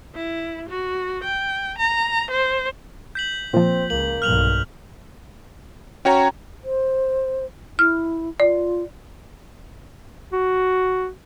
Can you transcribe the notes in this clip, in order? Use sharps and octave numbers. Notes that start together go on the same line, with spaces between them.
E4
F#4
G5
A#5
C5
G6 B6 F#7
A#2 F3 C4
C#2 A#3 F#7
B1 G2 F6 F7 F#7
C#4 F#4 C#5 G5 A#5
C5
E4 F6
F4 D5
F#4